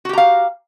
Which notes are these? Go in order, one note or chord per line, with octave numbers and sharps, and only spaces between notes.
F#4 G4 F5 A#5